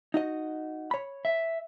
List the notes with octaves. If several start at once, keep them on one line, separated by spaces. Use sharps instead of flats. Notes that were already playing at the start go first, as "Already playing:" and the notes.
D#4 F#4 D#5
C#5 B5
E5